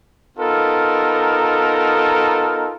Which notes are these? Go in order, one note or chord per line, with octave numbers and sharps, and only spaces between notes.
B3 D#4 F4 A4 A#4